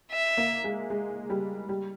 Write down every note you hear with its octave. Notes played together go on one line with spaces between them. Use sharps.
E5
A#3
G#3
G#3
G3
G3